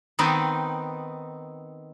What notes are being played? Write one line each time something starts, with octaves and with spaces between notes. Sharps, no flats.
D#3 B3 C4 D#4